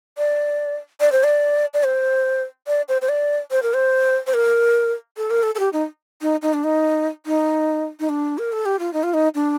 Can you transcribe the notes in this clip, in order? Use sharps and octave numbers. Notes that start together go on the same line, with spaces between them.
D5
D5
C5
D5
D5
C5
D5
C5
C5
D5
C5
A#4
C5
C5
A#4
A4
A#4
A4
A4
G4
D#4
D#4
D#4
D4
D#4
D#4
D#4
D4
A#4
A4
G4
F4
D#4
F4
D#4
D4